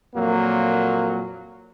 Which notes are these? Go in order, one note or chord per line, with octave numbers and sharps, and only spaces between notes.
F2 A#2 F#3 A#3